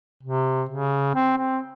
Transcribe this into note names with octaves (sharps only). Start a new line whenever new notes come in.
C3
C#3
C4
C4